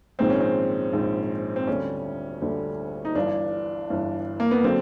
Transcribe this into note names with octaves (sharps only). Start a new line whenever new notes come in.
A#1 G#2 D#3 G#3 C4
C#4
C4
A#1 G#2 D#3 G#3
C4
D2 D3 G3 C#4
D2 D3 G3
D#4
G1 G2 E3 D4
G1 G2 E3
A#3
B3
D3 F#3 C4